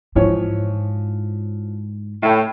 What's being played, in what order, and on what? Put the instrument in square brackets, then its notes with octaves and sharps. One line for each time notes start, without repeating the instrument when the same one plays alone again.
[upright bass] G#2 [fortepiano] E3 F3 C#5
[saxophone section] A2 [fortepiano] E5 G5